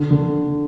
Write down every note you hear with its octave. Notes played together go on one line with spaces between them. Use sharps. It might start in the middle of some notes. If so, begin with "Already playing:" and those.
Already playing: D3
D3